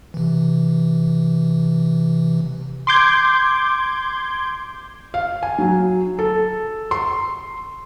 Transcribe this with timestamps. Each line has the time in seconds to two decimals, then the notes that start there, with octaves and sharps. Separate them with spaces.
0.14 C3 E3
2.87 C6 D6 G6 G#6
5.14 F5
5.43 G#5
5.58 F#3
6.19 A4
6.91 C6